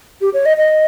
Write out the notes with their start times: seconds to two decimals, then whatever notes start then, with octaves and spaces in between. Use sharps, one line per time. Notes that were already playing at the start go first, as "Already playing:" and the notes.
0.21 G4
0.34 C#5
0.46 D#5
0.57 D#5